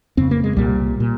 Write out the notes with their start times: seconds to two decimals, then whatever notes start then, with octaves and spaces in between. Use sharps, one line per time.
0.17 F2 C#3 C4
0.31 A#3
0.44 G#3
0.56 C2 A#2 G3
1.00 A#2